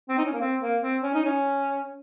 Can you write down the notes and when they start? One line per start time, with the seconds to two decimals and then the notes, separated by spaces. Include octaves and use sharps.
0.09 C4
0.18 D#4
0.25 C#4
0.33 A#3
0.41 C4
0.61 A#3
0.82 C4
1.03 C#4
1.14 D#4
1.25 C#4